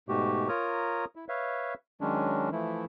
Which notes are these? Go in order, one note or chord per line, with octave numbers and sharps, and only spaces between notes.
G#2 B2 A3 F#4 G4
F4 A#4 C#5 A#5 D#6
E4
B4 C#5 E5 F5
D#3 F#3 G#3 C#4 D4
E3 F3 A3 E4